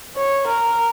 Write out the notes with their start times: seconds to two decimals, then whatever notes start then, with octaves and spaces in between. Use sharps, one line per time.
0.17 C#5
0.48 A#4